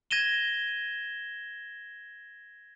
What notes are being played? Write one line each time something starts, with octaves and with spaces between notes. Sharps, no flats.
G#6 A#6 D#7 E7 G7